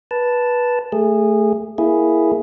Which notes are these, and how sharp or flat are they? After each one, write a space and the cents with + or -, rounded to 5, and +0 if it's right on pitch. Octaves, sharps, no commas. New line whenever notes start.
B4 -15 A5 +0
A3 +5 G#4 -20
A#3 +0 E4 +0 G#4 +0